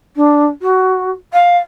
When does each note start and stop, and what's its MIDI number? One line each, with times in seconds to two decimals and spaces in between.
0.15 0.44 62
0.62 1.10 66
1.32 1.57 77